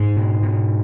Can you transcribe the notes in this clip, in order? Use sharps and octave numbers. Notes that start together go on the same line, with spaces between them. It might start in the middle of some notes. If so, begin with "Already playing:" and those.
Already playing: G#2 G#3
B2
B2